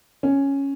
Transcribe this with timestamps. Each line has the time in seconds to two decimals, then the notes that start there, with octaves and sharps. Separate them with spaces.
0.23 C#4